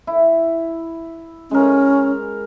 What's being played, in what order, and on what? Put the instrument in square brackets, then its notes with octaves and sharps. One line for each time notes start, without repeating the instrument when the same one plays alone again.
[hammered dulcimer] E4
[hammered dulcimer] G#3 A#4 [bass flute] C#4